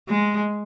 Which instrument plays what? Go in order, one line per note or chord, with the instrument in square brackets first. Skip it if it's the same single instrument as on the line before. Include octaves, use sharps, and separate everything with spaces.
[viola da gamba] G#3